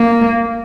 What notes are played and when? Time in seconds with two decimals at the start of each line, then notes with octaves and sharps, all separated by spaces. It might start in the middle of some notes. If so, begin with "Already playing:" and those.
Already playing: A#3